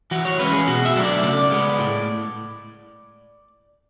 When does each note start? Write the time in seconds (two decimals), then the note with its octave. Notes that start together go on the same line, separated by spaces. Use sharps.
0.11 E3 F#4
0.25 C#5
0.39 G#3 C#4 E4 B4
0.53 G#4
0.67 B2 F#4
0.85 E5
0.95 F#3 A3 D4
1.05 D5
1.23 C#3 D5
1.52 G#3 B3
1.79 A2